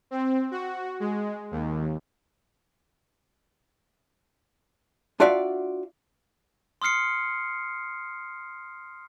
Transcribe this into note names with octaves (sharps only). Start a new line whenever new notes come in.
C4
F#4
G#3
D#2
D4 F4 F#4 D5 E5 F5
C6 D#6 F6 C7 C#7